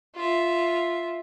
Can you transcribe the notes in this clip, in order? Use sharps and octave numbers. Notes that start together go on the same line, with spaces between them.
F4 E5